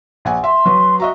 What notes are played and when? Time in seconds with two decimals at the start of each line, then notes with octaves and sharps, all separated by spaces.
0.25 A#1 F#5 G#5
0.44 E5 C6
0.66 F#3 F#4 B4
1.00 F#4 D#5 E5 A#5